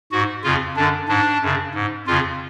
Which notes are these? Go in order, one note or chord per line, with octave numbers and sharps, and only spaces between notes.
G#2 F#4
F2 C#3 F4
F#2 D3 D4
G#2 D4
F#2 C#3
G#2
F2 C#3 F4